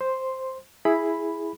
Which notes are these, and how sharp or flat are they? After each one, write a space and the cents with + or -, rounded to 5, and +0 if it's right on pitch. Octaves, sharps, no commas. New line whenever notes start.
C5 +0 C6 +0
E4 +0 G#4 +0 B5 +0